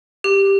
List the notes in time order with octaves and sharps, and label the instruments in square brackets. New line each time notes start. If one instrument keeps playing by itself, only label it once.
[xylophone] G4